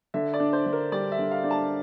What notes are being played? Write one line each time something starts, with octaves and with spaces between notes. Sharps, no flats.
D3 E5
D5
D4
C5
D3
A#4
G3 D5
E5
D3
F5
D4
A5